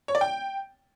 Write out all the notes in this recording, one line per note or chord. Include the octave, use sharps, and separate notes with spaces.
C#5
D5
G5